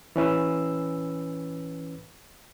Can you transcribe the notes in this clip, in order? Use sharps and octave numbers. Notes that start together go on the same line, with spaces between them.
E3 C#4 B4 E6